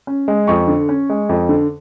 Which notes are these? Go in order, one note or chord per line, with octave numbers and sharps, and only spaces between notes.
C#4
G#3
F2 C#6
D3
C#4
G#3
F2
D3